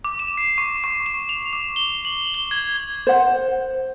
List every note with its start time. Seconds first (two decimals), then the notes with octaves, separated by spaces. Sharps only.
0.05 D6
0.19 E7
0.37 C7
0.58 C#6
0.84 C#6
1.06 E7
1.29 F7
1.53 D6
1.76 G7
2.05 F#7
2.34 G7
2.51 G#6
3.07 C5 F#5